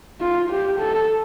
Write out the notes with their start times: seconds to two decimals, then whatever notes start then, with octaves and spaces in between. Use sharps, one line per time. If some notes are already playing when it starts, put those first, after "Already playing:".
0.21 F4
0.50 G4
0.79 A4